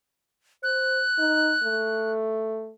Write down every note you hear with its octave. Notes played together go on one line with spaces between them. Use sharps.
C5 F#6
D#4
A3